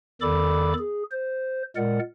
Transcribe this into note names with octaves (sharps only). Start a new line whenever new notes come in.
E2 D#3 A4 D5 B5 D6
G#4
C5
A#2 G#3 A#4 D5 F#5